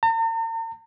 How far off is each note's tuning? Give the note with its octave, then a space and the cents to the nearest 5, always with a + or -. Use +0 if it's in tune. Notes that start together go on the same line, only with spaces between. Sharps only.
A#5 -45